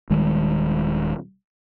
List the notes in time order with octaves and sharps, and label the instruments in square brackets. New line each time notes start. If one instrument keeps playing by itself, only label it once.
[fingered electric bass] D#1 D#3 G3 G#3